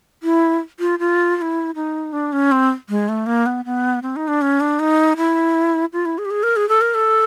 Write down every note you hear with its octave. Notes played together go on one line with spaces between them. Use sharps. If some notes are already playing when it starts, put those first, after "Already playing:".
E4
F4
F4
F4
E4
D#4
D4
C#4
C4
G#3
A3
A#3
B3
B3
C4
D#4
D4
C#4
D4
D#4
E4
F4
E4
G#4
G4
G#4
A#4
G#4
A4
A#4
A4